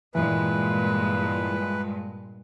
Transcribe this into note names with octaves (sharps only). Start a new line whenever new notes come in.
G2 A#2 E3 G#3 B4